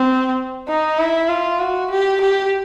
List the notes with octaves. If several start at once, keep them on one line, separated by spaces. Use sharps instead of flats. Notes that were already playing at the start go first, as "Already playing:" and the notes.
Already playing: C4
D#4
E4
F4
F#4
G4
G4